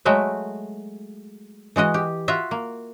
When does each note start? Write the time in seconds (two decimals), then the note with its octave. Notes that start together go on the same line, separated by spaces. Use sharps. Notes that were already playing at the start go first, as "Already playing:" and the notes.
0.05 F#3 G#3 A3 F#4 E5
1.76 E3 G#3 F#4 D#5
1.94 G4
2.28 F4 F#4 E5
2.51 A#3